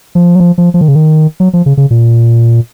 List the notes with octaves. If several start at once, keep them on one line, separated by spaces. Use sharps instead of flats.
F3
F#3
F3
F3
F3
D#3
C#3
D#3
F#3
F3
C#3
C#3
A#2